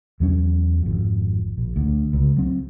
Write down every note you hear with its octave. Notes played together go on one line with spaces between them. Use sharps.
E2 F#3 C#4
G#1 F2
A#1
D2
C#2
F#3 C4